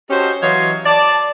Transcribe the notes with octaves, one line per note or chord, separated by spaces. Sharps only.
C#4 F#4 G4 A4 C5 D#5
E3 F#3 C#5 D#5 F5 C6
D5 A5